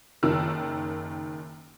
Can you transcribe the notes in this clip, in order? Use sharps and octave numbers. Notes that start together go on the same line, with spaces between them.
F#1 D#3 E6